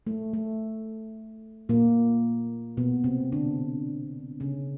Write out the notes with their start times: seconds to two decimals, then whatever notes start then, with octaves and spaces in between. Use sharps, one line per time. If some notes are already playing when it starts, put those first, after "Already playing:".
0.07 A3
0.33 A3
1.69 A#2 A#3
2.77 B2 B3
3.04 C3 C4
3.32 D3 D4
4.40 C#3 C#4